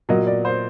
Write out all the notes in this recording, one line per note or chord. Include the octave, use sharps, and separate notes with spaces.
A#2 F#3 A#3 D#5
D5
C5